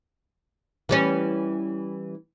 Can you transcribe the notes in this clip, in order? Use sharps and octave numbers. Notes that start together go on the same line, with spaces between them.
E3 G3 C#4